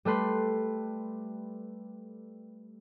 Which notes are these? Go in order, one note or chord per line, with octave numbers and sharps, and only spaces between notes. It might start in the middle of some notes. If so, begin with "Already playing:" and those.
G3 A3 B4 C6